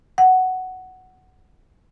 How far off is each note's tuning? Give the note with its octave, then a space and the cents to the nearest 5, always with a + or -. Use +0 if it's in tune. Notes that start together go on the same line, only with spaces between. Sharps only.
F#5 +5